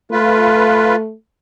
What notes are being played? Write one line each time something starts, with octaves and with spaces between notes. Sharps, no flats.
A3 F4 B4